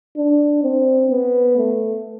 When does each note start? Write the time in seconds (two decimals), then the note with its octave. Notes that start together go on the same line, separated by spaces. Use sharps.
0.17 D4
0.64 C4
1.11 B3
1.58 A3